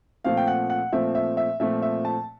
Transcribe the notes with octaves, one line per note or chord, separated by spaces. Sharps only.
A#2 F3 A3 C4 F5
G5
F#5
F#5
A#2 F3 A3 C4 E5
E5
E5
A#2 F3 A3 C4 E5
E5
A5